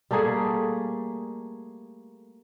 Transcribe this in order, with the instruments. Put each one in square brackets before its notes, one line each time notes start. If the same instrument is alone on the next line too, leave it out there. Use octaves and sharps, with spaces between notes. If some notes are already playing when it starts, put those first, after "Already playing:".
[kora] G3 A3 A#3 G#4